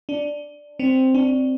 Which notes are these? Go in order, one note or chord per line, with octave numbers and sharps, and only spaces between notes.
D4
C4
D4